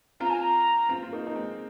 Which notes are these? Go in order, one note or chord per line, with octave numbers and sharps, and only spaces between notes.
C4 F4 A#5
G#5
A#5
C4 F4
F4
A#3 D#4
D#4
G#3 C4